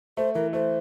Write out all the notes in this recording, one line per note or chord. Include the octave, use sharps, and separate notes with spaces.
A3 C5
E3 A#4
A3 C5